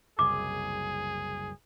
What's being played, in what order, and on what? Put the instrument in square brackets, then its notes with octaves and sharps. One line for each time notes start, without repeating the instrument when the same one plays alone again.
[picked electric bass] F#1 C2 [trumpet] G#4 [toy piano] D6